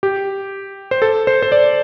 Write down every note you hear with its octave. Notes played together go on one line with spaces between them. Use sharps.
G4
C5
A4
C5
C5
D5